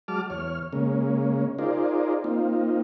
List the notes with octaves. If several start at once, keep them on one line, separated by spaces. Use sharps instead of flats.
F#3 G#3 A5 D6 F6
E2 C#5 F6
C#3 G#3 A#3 C#4
D#4 F4 G#4 A#4 C5 D5
A#3 C4 D#4 F4